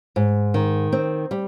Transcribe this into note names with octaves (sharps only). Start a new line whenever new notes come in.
G#2
D#3
C4
G3